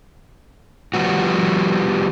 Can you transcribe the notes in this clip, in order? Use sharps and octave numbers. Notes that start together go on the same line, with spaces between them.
F3 G3 B3 F#4